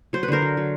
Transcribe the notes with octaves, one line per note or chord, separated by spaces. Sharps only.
F#3 C5
B4
D3 A#4 C5
F#3
F#3